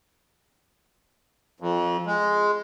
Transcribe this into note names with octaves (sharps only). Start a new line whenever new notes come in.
F2
G#3